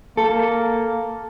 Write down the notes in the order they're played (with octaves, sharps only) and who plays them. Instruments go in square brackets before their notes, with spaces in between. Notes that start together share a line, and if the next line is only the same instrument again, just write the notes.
[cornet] A#3 [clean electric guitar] A4